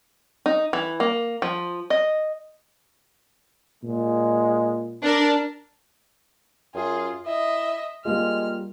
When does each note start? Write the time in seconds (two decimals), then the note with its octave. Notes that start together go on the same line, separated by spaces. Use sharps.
0.46 D#4
0.73 E3
1.00 A#3
1.42 F3
1.90 D#5
3.83 A#2 G#3
5.03 D4 A#4
6.75 F#2 F4 G#4
7.26 E4 D#5 E5
8.05 G3 G#3 A#3 F4 F6